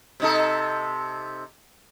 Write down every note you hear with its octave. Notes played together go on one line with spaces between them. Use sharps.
C3 D#4 A4